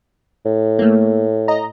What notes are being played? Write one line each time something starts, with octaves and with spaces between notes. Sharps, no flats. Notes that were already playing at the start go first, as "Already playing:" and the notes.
A2
A3 A#3
D#5 A#5